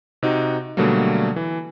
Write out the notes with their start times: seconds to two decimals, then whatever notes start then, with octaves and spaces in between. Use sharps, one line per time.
0.23 C3 D#4 F#4
0.77 B2 D3 F#3 G3 A3 A#3
1.36 E3